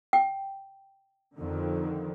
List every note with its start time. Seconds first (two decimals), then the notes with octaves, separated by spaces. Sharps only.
0.13 G5
1.37 F2 D3 D#3